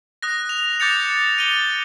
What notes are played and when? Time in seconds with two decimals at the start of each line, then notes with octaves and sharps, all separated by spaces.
0.23 D#6 F#6 A#6
0.49 F7
0.80 D6 G6 A6 C#7 F7
1.38 D#7 G7